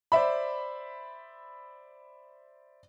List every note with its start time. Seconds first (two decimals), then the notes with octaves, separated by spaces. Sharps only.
0.12 C5 D5 E5 B5